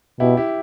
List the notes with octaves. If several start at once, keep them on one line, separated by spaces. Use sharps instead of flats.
B2 E4 G4
E4 G4